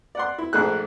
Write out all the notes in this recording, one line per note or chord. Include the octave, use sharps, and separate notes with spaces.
D5 F#5 C6
E4
A#1 G#2 G#3 A3 G#4 F#6